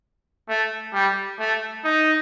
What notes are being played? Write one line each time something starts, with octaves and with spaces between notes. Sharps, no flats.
A3
G3
A3
D#4